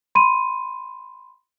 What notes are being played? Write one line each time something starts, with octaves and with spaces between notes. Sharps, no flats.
B5 C6 D#7